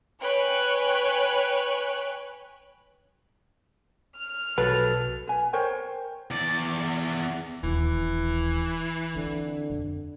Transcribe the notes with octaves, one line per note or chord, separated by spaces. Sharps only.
B4 C#5 G5 G#5 F#6
F6
B1 F#3 A4 B4
B4 G#5
A#4 C5 C#5 G5
E2 D5
D#1 D#2 E3
D3 C4
F2